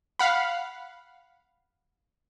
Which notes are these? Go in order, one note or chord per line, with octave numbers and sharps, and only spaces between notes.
F5 F#5 B5